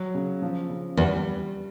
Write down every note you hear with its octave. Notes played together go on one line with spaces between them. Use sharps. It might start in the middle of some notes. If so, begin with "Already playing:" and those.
Already playing: F#3
C#3
F3
C#3
E2 G3